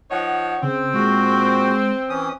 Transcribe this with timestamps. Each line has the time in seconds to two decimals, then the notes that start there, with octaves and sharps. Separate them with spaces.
0.11 F3 D#4 C#5 F#5
0.63 C#3 C4
0.94 A#2 G#3 F#4
2.09 E3 C#4 D#6